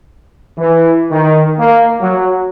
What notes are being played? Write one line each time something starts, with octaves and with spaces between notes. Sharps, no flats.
E3
D#3
A#3
F#3